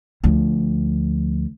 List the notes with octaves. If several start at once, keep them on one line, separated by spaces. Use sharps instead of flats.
D2 F3